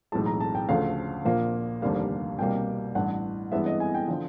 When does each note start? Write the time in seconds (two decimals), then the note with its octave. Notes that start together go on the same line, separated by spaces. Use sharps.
0.12 B1 A2 E3 G#3 A5
0.26 A#5
0.40 A5
0.55 G5
0.69 D2 C#3 F3 A3 F5
1.25 A#1 A#2 F3 A#3
1.82 F1 D#2 D3 G3 A#3 F5
2.39 C2 B2 G3 A#3 G5
2.95 A1 G2 E3 F#5
3.52 G2 E3 G#3 B3 E5
3.66 D#5
3.80 G#5
3.95 G5
4.08 D3 F3